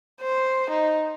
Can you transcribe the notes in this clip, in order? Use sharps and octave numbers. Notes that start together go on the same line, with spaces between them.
C5
D#4